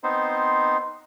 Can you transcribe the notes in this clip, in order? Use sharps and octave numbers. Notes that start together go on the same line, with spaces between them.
B3 C4 D#4 C5